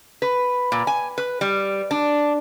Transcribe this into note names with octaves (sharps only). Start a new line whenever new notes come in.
B4
A#2
G#5
B4
G3
D4